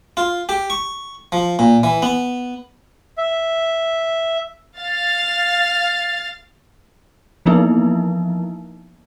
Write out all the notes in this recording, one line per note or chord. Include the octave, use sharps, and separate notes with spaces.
F4
G4
C#6
F3
A#2
E3
B3
E5
F5 A6
E3 F3 A#3 B3 D#4 E4